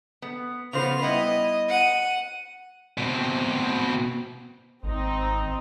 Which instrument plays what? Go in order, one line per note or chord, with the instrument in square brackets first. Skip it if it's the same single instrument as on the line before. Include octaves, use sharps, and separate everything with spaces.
[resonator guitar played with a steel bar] B3
[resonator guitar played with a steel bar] C#3 F3 C5 [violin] B3 F7
[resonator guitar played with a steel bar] G3 B3 E4 [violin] D#5
[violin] F#5 D#7
[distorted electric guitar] B2 C4
[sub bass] G#1 [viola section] C4 D#4